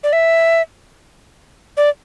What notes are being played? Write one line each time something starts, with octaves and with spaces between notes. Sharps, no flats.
D5
E5
D5